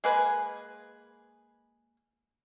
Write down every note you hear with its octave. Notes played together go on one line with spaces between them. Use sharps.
G#3 A#3 G#4 B4